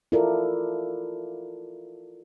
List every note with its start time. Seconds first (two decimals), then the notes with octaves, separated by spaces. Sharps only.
0.12 E4 F4 A4 A#4 D5